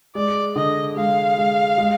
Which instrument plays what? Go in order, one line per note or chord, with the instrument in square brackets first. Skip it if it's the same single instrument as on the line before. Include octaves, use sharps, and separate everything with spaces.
[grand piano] G#3 [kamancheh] D5
[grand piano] D3 [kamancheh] D#5
[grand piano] G#3 [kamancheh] F5
[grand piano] G#3
G#3